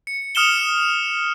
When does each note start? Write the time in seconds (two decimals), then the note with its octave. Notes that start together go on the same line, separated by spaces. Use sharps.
0.07 C#7
0.35 D#6 F6 C#7 E7 G7